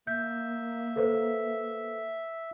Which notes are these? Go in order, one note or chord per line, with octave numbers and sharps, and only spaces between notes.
A#3 E5 G6
A4 B4 C5